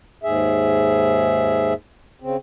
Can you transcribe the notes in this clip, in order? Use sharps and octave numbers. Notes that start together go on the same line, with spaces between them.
D#2 G#2 G#4 E5
C#3 C4